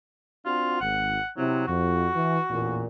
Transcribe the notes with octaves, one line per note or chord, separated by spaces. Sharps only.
C4 D4 F4 F#4
G#1 F#5
C3 F#3 C4 E4
F2 F#4
E3
A1 E2 A#2